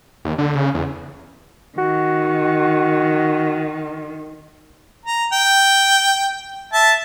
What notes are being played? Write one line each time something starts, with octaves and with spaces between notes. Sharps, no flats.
D#2
D3
C#3
E2
D#3 F#4
A#5
G5
E5 A5